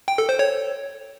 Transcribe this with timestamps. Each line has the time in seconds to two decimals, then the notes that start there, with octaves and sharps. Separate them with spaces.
0.08 G5
0.18 A4
0.29 C5
0.39 C#5